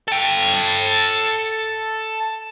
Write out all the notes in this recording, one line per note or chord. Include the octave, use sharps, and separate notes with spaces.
A4 G5